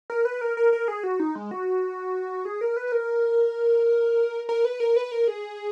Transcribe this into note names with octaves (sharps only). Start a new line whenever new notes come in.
A#4
B4
A#4
A#4
A#4
G#4
F#4
D#4
G#3
F#4
G#4
A#4
B4
A#4
A#4
B4
A#4
B4
A#4
G#4